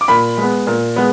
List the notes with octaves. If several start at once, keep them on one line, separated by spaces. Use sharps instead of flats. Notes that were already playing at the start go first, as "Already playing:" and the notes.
D6
A#2 B5
G#3 B3
A#2
G#3 B3